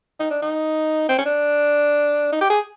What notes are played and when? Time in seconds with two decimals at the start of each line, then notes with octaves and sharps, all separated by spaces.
0.20 D#4
0.31 D4
0.42 D#4
1.09 C4
1.18 C#4
1.26 D4
2.32 D#4
2.41 G4
2.50 G#4